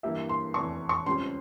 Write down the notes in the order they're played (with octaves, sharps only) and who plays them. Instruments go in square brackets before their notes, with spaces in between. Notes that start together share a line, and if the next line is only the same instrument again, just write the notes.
[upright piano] G2 E3 A#3 E4 G4 [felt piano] E5
[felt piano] C6
[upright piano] F1 E2 C3 E3 [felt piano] C#6
[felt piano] C#6
[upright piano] C#2 C#3 G3 C4 G4 [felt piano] C6